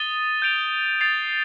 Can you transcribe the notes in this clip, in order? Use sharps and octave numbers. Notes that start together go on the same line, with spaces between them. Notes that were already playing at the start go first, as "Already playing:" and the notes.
Already playing: D#6 A6 D#7 G7
G6 D7 F7
A6 C7 F7